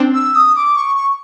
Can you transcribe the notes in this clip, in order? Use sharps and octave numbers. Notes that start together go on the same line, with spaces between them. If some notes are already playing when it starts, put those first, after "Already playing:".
Already playing: C4 D4
E6
D#6
D6
C#6
C#6